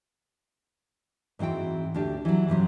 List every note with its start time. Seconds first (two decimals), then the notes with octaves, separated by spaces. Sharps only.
1.39 G#2 E3 C4 F#4 G5
1.94 D2 D4 G4
2.25 E3 F#3
2.48 G2 C3 F#3 C#4